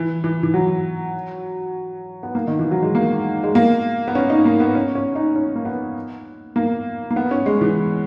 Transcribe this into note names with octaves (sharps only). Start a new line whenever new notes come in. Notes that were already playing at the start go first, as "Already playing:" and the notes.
Already playing: E3
E3
E3
F#3
B3
A#3
D#3
E3
F#3
G#3
A#3
G#3
A#3
B3
C#4
D#4
A#3
B3
C#4
C#4
D#4
C#4
A#3
B3
A#3
A#3
B3
C#4
G#3
E3